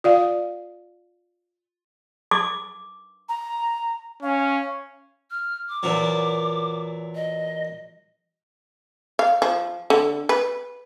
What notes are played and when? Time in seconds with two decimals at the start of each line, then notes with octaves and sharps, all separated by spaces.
0.04 F4 D5 F5
2.31 D6
3.29 A#5
4.23 C#4 F5
5.31 F6
5.69 D6
5.83 E2 A#2 F#3
7.15 D#5
9.19 F5
9.42 F3
9.90 D3
10.29 B4